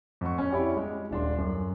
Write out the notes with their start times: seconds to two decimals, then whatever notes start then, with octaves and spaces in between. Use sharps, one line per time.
0.21 F2 F#5 C#6
0.38 C#4
0.51 E4 F#4 G4 C#5 D5
0.77 G#3
1.11 D#1 D4 C6
1.38 F#2